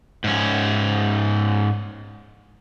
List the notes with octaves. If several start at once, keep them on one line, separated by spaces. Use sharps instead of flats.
G#2 C#4